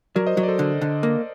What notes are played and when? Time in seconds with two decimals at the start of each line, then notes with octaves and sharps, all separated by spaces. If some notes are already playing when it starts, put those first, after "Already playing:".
0.15 F#3 A#4 D5
0.27 C5 D#5
0.37 F#3
0.43 D5
0.48 A4 C5
0.59 D3
0.81 D3
1.03 A#3